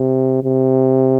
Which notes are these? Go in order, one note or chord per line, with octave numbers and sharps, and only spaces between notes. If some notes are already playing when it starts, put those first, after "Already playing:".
Already playing: C3
C3